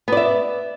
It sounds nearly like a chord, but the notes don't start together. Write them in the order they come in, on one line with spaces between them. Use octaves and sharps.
B3 D5 E5